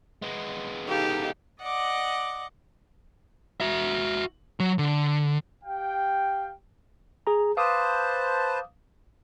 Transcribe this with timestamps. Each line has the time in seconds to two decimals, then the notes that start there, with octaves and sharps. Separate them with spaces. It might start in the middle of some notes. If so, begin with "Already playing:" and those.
0.22 G#3 B3
0.88 D#4 G4 A4 F5
1.61 D5 D#5 F#5 D6
3.60 F#4 E5
4.60 F#3
4.78 D3
5.64 G4 F5 G5
7.27 G#4 A#5
7.57 B4 C5 F5 A5 D6 D#6